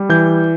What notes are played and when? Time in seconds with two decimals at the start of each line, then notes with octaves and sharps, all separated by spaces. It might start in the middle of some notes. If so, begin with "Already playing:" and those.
Already playing: G3
0.09 E3 G6